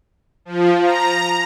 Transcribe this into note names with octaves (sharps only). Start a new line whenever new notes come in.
F3
A#5